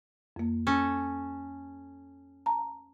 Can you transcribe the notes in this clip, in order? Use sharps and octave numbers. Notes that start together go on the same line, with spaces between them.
F2 A#3
C#4 A4
A5 A#5